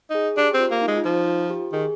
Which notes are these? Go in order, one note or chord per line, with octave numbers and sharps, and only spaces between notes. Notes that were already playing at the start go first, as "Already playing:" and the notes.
D#4 G#4
D4 G4
C4 G4
F4
A#3
D#4
G#3
F4
F3 D#4
F4
G4
D#3 G#4